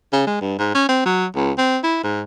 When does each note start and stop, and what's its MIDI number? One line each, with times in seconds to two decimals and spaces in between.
0.13 0.25 49
0.27 0.38 56
0.41 0.58 43
0.59 0.71 44
0.75 0.84 61
0.89 1.01 60
1.05 1.25 54
1.35 1.52 37
1.58 1.78 60
1.83 1.99 64
2.04 2.22 44